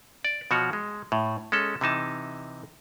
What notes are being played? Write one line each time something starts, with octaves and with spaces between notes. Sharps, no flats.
D5
B2 F3 F#4 C#5
G#3
A2
G#3 C#4 A4
C3 E3 D#4 A5